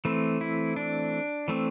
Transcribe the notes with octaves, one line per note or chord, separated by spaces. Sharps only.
E3 A3 C4
E4
D4
E3 A3 C4